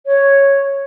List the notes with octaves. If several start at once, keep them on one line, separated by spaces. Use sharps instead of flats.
C#5